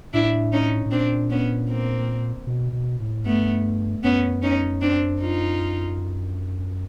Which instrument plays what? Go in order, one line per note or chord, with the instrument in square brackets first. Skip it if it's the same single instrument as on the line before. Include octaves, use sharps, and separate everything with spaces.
[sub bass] A2 [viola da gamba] D4 E4
[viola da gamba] C#4 D#4
[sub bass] A2
[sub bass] A#2 [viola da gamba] C4 D4
[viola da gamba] B3 C#4
A#3 C4
[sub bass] B2
B2
A2
[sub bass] G2 [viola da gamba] A3 B3
[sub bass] F#2 [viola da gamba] B3 C#4
[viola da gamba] C#4 D#4
C4 D4
D#4 F4